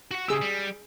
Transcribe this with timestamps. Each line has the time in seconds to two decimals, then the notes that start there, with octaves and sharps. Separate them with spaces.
0.11 F#4 F#5
0.28 C#3 G4 G#4 E6
0.41 G3